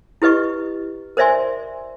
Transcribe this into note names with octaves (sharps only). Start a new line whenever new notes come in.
E4 G4 B4 D#5 C#6
A#4 C5 D5 E5 G#5 C6